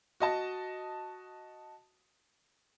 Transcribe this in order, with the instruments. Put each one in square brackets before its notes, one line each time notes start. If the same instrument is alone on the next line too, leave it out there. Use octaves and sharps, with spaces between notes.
[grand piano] F#4 D#5 A5